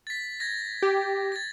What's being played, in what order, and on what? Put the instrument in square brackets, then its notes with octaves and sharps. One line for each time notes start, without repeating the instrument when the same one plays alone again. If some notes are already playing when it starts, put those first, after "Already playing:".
[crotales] A6 B6
G#6 A#6
[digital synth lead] G4
[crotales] A6 A#6